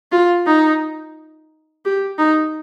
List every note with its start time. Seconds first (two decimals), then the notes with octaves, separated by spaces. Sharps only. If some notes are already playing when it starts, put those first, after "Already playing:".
0.12 F4
0.46 D#4
1.85 G4
2.18 D#4